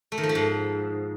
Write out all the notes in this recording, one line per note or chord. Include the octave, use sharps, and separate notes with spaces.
A3
D#3
F3
A3
G#2